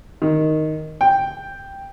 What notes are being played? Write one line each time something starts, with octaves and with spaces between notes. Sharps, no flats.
D#3
G5